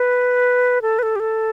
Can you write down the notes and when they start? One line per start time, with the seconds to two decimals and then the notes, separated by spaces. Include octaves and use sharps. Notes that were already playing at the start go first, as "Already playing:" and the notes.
Already playing: B4
0.82 A4
0.99 B4
1.03 A4
1.16 G4
1.20 A4